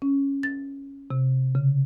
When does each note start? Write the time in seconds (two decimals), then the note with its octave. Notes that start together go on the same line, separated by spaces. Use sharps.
0.02 C#4
0.43 A6
1.11 C3
1.55 C#3